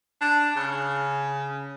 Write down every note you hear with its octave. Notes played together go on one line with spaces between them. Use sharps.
D4
C#3